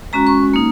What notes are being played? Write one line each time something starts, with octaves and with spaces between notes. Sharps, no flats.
G#3 C#4 F#4 A#5
C#6
A#3 D#4